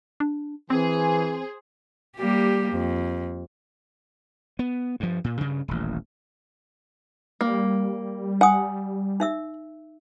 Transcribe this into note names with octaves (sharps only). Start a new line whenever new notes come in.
D4
E3 C4 G#4 C5
G3 A#3 G4
F2
B3
G2 F3
A#2
G2 C#3
D#1 A1
G3 A#3
F#5 G#5 D#6
D#4 E5 E6